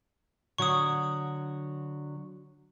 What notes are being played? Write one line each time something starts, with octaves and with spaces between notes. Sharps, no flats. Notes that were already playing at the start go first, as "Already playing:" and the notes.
D3 F#3 C#6 D#6